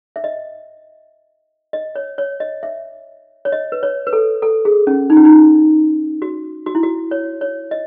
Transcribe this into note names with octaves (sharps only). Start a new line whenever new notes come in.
E5
D#5
D#5
C#5
C#5
D#5
E5
C#5
D#5
B4
C#5
B4
A4
A4
G#4
C#4
D#4
C#4
D#4
F#4
F#4
E4
F#4
C#5
C#5
D#5